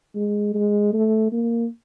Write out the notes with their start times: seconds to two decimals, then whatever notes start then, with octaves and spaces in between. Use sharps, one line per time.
0.15 G#3
0.54 G#3
0.93 A3
1.32 A#3